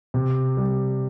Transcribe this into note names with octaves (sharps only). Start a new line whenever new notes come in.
C3
G3